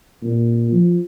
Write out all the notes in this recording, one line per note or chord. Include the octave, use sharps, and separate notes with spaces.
A#2
F3